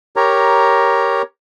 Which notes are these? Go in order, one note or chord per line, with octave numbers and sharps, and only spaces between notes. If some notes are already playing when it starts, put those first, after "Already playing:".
G4 A#4 C#5 A#5